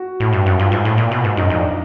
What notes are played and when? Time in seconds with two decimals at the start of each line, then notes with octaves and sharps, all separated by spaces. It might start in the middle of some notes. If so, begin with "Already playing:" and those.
Already playing: F#4
0.20 A2
0.33 G2
0.46 F#2
0.59 G2 F4
0.72 G#2
0.85 A2
0.98 A#2
1.11 B2
1.24 G#2
1.37 F#2 D#4
1.50 F2
1.57 D4